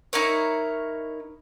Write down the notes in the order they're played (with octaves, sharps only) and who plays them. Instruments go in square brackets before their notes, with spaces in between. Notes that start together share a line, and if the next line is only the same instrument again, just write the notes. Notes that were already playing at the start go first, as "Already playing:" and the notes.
[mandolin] D#4 E4 A#4 C#5